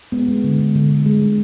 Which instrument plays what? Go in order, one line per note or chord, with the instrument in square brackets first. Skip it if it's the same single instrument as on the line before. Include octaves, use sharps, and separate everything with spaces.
[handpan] G#3 B3
G#3
D3
D3
D3
D3
G#3
G#3